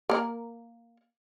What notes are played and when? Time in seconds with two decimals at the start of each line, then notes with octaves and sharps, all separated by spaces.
0.09 A#3 A#4